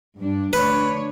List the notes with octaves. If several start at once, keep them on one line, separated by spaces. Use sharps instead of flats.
G2 D4
D2 D4 B4 C#5